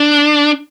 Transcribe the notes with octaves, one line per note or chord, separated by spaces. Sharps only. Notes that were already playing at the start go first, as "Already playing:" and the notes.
Already playing: D4